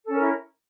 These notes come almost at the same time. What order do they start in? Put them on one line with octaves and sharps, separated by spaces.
A4 C#4 A#4 E4